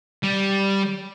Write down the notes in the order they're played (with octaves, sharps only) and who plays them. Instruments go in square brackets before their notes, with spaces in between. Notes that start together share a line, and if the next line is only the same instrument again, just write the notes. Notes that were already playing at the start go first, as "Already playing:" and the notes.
[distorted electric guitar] G3